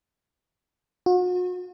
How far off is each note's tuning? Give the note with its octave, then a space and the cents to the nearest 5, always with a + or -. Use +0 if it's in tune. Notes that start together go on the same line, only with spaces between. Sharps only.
F#4 -40